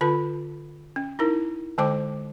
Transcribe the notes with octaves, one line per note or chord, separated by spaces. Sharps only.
D3 F4 B4 B5
C#4
D#4 E4 A#4
D3 G#3 C5 G5 D6